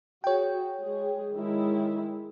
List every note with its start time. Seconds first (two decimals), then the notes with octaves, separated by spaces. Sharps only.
0.24 F#4 G#4 C#5 G5
0.80 G#3 G#4
1.35 D#3 G#3 E4